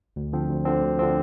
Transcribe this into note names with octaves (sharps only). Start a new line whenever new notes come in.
D2
D3 F3 C4
D2
D3 F3 C4
D2
D3 F3 C4